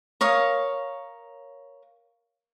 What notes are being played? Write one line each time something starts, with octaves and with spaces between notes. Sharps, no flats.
A#4 C#5 F5 D#6